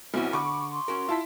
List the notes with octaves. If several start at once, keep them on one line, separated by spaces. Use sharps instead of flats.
B1 C4 E4 F#4
D3 B5 C#6 D6
C6
C#4 F#4 A#4
E4 F4 A5 B6